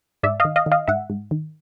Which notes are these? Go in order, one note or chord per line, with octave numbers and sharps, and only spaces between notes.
G#2 D5 E5
D#3 D#5 F5
D#5 F5
D#3
D#5 F5
G#2 E5 F#5
G#2
D#3